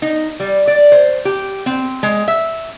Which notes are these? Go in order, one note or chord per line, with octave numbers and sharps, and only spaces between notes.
D#4
G3
D5
C5
G4
C4
G#3
E5